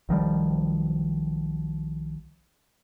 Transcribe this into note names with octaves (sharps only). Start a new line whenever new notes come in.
B1 D#3 F3 G3